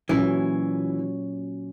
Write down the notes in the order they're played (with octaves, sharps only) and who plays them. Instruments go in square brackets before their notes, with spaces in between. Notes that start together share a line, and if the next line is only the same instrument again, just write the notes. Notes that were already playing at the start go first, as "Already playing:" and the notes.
[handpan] A#2 F#3 C#4 [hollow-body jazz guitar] E3